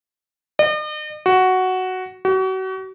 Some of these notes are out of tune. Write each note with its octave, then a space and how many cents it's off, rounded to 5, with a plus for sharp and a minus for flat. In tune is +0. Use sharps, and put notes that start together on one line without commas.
D#5 -45
F#4 +5
F#4 +35